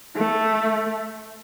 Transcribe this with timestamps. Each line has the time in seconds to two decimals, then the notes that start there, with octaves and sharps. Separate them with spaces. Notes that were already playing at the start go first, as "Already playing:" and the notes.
0.16 A3